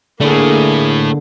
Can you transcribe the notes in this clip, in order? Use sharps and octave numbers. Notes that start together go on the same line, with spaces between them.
D3 A3 A#3 E4 G#4